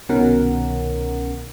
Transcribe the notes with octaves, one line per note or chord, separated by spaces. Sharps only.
C2 B2 D#3 C#4 A#4 F#5